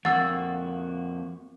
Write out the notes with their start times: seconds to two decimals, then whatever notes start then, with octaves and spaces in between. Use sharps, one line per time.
0.05 F2 A#3 F#4 F#5 E6 A6